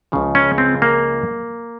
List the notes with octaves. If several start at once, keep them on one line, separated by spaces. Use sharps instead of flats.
C#2 C#3 F3
C#4
C4
A#3